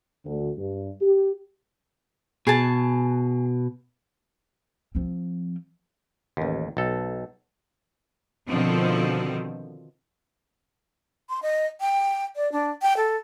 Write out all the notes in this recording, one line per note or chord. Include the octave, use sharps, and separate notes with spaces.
D2
G2
G4
B2 G#4 G#5 A5
F3 C4
A1 D#2
B1 A4
B2 D3 D#3 F3 C4
C6
D#5
G5
D5
D4
G5
A4